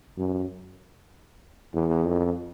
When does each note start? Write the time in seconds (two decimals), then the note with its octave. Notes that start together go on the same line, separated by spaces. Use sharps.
0.18 F#2
1.74 E2
2.05 F2